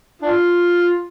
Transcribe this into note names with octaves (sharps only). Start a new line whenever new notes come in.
D4 F4